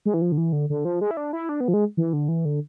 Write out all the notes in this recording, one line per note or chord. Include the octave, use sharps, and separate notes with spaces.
G#3
E3
F3
D3
E3
D3
D3
F3
G#3
E4
D4
E4
D4
B3
F3
G#3
E3
D3
E3
D3